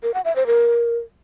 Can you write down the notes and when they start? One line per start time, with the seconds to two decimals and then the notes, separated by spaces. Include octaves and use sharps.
0.03 A#4
0.14 F#5
0.25 E5
0.36 C5
0.47 A#4